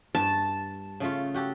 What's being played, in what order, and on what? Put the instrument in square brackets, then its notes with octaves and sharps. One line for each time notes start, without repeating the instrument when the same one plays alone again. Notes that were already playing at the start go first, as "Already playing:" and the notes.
[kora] G2 [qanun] A5
[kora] C#3 A3 F4
F#4 G4 A4